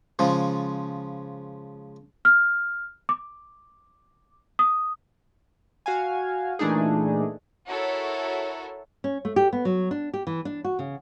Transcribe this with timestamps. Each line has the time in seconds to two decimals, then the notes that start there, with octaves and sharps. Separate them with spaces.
0.19 C#3 F3 G#3
2.25 F6
3.09 D6
4.59 D#6
5.86 F#4 F5 G#5
6.59 A#2 E3 A3 D4 D#4 G#4
7.68 E4 F#4 A4 A#4 C#5
9.04 C#4
9.25 A3
9.36 G4
9.53 B3
9.65 F#3
9.91 D4
10.14 G4
10.27 E3
10.45 D4
10.64 F#4
10.79 C#3